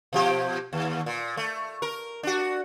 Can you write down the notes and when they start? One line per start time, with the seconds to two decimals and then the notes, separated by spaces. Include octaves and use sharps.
0.13 B2 F3 G4
0.73 D#2
1.06 A#2
1.37 A3
1.82 A#4
2.23 D4 F#4